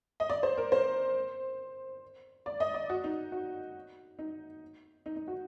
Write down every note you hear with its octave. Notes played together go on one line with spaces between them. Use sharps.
D#5
D5
C5
A#4
C5
D5
D#5
D5
F#4
D#4
F#4
D#4
D#4
D#4
F#4